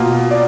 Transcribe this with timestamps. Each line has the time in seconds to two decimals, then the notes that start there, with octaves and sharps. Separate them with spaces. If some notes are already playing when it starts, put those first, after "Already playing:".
Already playing: B2 A#3 F4
0.31 D5